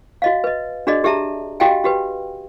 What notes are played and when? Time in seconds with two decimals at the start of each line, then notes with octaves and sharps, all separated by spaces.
0.22 F#4 D#5 F5
0.44 B4 D#5
0.87 D4 F#4 G#4 D5 D#5
1.04 G4 G#4 E5 A5 A#5
1.60 F#4 G4 D#5 F5 G5 G#5
1.84 F#4 G4 B4